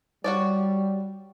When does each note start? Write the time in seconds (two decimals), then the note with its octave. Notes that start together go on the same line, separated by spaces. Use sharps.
0.24 G3 F#4 C#5 D5